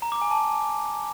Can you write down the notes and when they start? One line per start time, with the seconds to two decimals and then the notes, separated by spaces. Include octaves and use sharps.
0.02 A#5
0.12 D6
0.22 G#5
0.31 A5